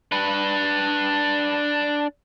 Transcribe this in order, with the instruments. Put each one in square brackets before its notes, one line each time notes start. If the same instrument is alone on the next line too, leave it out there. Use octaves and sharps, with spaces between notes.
[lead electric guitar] D4 B4